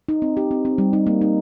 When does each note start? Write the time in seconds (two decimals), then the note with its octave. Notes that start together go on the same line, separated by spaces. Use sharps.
0.09 D#4
0.22 C4
0.37 G4
0.51 C4
0.65 C4
0.78 G3
0.93 D#4
1.07 A#3
1.21 D#4